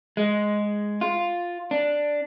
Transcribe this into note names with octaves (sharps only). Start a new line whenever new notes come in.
G#3
F4
D4